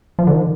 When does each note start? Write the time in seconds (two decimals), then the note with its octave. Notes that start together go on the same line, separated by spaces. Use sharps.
0.19 F3
0.27 D3
0.32 D#3